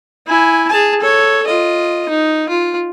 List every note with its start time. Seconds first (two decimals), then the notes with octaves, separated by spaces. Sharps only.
0.27 E4 G#5
0.69 G#4 A5
1.01 A4 C#5
1.47 F4 D#5
2.09 D#4
2.49 F4